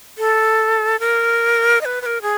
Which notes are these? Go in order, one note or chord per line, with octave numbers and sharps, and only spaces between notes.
A4
A#4
D#5
B4
B4
A#4
G#4